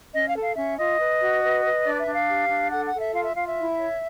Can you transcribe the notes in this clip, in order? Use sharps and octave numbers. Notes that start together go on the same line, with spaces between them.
C#4 D#5
F5
A4
F5
C#4 E5
F4 D#5
B4
F#4
B4
B4
D4 D5
E5
D4
F5
G4
D4
A4 F#5
F#5
A4
E5
F4 F5
E5
F4 F5
E5
E4
C#5